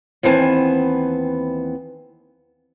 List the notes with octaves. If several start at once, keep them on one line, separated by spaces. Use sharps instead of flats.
D#2 E3 B3 C4 G#5 A5